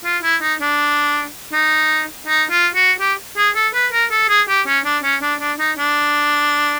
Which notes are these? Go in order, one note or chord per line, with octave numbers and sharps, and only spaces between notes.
F4
E4
D#4
D4
D#4
D#4
F4
F#4
G4
G#4
A4
B4
A#4
A4
G#4
G4
C#4
D4
C#4
D4
D4
D#4
D4